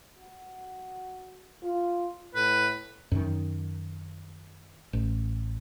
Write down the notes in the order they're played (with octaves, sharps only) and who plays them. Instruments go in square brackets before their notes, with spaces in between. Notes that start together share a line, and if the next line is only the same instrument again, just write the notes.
[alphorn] F#4
F4
[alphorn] A2 [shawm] B4
[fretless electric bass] F#2 D#3
A1